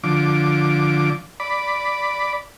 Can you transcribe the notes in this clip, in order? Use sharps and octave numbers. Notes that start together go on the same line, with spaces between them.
D3 F3 D6
D5 B5